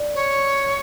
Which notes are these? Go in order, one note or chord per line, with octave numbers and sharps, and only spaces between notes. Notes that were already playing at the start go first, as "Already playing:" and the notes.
Already playing: D5
C#5